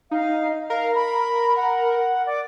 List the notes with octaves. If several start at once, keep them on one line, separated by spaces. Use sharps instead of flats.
D#4 F5
A#4 F5
B5
F#5
D5